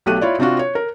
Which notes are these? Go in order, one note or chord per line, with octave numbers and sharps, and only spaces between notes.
B1 A3 G4 F#6 D#7
E4 F4 C#5 D5
C3 C4 D4 F4 F#4
C#5
A#4